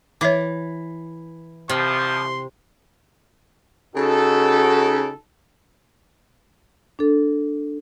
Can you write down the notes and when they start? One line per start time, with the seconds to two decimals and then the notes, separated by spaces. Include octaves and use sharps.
0.21 E3 C#5 E5 D6
1.69 C2 C3 F3 C6
3.96 C#3 D#4 F#4 A4
6.99 D4 A4